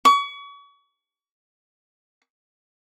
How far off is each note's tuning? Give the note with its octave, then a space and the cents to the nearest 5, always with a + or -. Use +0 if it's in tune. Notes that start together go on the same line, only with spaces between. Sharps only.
C#6 +35